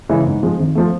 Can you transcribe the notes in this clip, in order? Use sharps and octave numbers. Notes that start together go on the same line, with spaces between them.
C#3 E3 G#3
G#2
F3 G#3
G#1
F3 A3